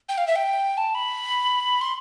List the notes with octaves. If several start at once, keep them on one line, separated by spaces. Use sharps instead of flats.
G5
F5
E5
G5
A5
B5
C6